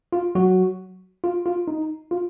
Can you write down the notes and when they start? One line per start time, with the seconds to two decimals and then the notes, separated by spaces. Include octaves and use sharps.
0.13 F4
0.35 F#3 F#4
1.24 F4
1.46 F4
1.68 D#4
2.11 F4